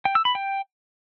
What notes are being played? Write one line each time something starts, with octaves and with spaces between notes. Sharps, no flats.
G5
E6
B5
G5